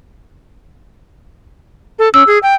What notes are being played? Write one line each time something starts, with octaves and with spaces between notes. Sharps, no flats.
A4
C#4 E6
G#4
G5